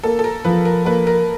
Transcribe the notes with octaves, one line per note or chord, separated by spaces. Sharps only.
A#3 A4
A4
A#4
F3 B4
A#4
A#3 B4
A#4